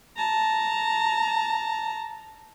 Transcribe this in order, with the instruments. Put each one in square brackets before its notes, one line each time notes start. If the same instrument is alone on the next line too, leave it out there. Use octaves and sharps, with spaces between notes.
[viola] A5 A#5